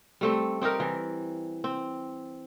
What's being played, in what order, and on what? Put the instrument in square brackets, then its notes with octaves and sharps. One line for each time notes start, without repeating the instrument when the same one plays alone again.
[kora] G3 A3 C4
C4 D#4 G4 A#4
E3
C4